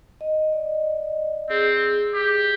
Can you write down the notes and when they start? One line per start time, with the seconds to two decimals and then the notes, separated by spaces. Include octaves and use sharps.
0.21 D#5
0.52 D5
1.49 C4 G#4
2.14 G4